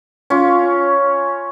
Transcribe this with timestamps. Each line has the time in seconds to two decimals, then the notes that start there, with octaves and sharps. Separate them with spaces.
0.30 C#4 F4